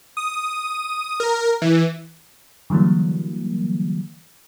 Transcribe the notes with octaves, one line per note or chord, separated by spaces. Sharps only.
D#6
A#4
E3
D3 E3 F#3 G3 A#3